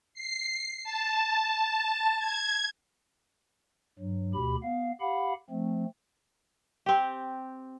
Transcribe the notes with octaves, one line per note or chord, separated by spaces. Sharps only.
C7
A5
G#6
G2 F#3
D2 B2 G4 B5
B3 F5
G4 F5 F#5 B5
F3 A3 C4
C4 G4